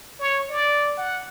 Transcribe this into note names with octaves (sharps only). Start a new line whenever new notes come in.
C#5
D5
F#5